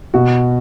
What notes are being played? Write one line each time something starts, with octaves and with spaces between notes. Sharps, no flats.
B2 F#4